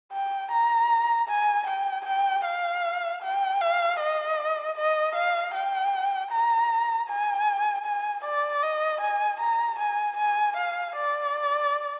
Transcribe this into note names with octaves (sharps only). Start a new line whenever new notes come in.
G5
A#5
G#5
G5
G5
F5
G5
F5
D#5
D#5
F5
G5
A#5
G#5
G#5
D5
D#5
G#5
A#5
G#5
G#5
F5
D5